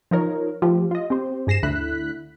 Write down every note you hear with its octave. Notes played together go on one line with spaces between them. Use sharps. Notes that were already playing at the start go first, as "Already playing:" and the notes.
F3 D#4 A#4 C#5
F3 A3 G4
F4 D#5
C4 G4 C5
G2 G#4 A#6 C7 E7
D2 D3 E4 F#6 B6